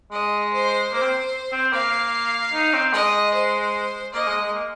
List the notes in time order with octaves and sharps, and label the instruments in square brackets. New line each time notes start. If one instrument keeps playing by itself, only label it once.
[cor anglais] G#3 [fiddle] D#5
[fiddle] C5
[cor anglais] A#3 [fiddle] C5
[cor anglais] C4
C4
[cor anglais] A#3 [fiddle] F5
[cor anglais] D#4
C4
[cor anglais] G#3 [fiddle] D#5
[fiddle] C5
[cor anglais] A#3 [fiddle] D#5
[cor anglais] G#3
G#3
A#3